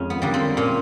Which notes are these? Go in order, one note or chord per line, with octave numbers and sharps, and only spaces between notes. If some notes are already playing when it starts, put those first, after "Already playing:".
Already playing: F2 G#3 C#4
B3
D3 G3 A#3
C4
A#2 C#4